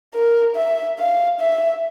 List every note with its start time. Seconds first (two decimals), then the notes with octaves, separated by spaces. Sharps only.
0.15 A#4
0.56 E5
0.99 F5
1.40 E5